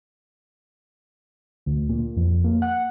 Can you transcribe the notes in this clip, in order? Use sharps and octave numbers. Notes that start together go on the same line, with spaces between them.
D2
A#2
F2
A#3
F#5